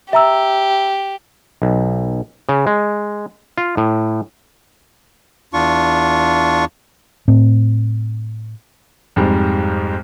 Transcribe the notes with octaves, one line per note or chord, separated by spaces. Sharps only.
G4 E5 A#5 E6
B1
C#3
G#3
F4
A2
E2 D4 F4 C#6
A2 C4
F2 G#2 G3 G#3